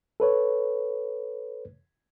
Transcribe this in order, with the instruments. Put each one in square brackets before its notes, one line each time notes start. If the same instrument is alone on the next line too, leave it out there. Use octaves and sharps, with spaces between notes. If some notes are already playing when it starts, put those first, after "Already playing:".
[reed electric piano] A4 B4 C#5